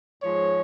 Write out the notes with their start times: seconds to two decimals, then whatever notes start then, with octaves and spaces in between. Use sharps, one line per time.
0.22 G#2 F3 G#3 C#5